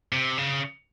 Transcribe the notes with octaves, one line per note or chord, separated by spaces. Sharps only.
C3
C#3